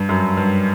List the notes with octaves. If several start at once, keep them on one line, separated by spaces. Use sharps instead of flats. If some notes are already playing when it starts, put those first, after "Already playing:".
Already playing: G2
F#2
G2